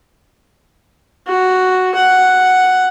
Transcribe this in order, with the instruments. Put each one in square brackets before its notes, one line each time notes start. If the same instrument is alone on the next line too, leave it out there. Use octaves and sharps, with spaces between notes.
[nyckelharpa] F#4
F#5